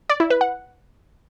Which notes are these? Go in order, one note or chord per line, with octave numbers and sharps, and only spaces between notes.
D5
E4
B4
F#5